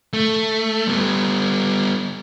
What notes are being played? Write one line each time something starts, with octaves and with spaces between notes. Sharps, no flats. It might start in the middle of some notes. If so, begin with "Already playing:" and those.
A3
G3 B3